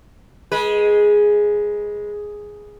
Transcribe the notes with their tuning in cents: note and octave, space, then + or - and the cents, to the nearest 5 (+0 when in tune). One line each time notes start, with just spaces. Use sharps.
G#3 +0 B4 -30